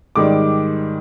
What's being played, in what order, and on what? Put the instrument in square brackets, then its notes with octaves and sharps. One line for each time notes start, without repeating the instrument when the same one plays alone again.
[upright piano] G#2 D#3 G3 D6